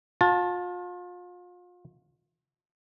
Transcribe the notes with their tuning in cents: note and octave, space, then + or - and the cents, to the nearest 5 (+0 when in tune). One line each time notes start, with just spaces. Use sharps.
F4 +35 A5 +0